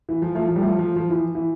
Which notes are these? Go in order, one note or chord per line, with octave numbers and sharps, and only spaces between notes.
E3
F3
F3 A3
F3
G3
F3 A3
F3
F3
E3
E3